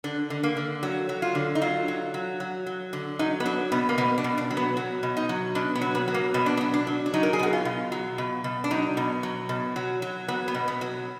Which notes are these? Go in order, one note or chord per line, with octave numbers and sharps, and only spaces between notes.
D3 D4
D3
A#3
D3
F#3
F#3
F4
D3
D#4
F#3 F4
F#3
F#3
F#3
F#3
D3
F#3 D#4
B3
F#3 D4
B2 B3
A#3
B2 B3
D4
B2
D4
F#3
B3
F#3
B2
D#4
F#3
B2 D4
B3
F#3
B3
F#3
A#3
B2 B3
D4
B3
F#3
D4
F#3
D4
F#3 D#4
A#4
G#4
B2 F#4
F4
B2
F#3
B2
B2
D4
F#3 D#4
B2
F#3
B2
F#3
F#3
F#3 B3
B3
B2
B3
F#3